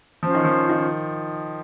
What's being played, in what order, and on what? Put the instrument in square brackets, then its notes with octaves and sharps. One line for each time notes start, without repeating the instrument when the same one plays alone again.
[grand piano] F3 [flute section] C#4 F4 C5
[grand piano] D#3
F3
D#3